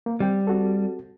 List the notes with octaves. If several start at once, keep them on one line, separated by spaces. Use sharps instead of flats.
A#3
G3 C4 G5
C4 F#4 A4